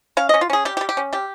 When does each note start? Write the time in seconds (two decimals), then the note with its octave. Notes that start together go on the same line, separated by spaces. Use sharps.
0.17 C#4 F5
0.29 C#4 D#5
0.41 F4
0.50 C#4 G#4
0.65 G3 G4
0.77 G4
0.81 G3
0.89 G4
0.97 C#4
1.13 G3 G4